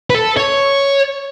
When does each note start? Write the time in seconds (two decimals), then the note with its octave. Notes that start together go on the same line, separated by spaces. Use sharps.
0.10 B4
0.15 A4
0.37 C#5